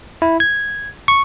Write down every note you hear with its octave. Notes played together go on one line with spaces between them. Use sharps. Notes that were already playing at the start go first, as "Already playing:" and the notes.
E4
G#6
C#6